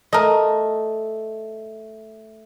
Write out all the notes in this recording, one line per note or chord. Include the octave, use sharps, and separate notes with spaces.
A3 A#4 D#5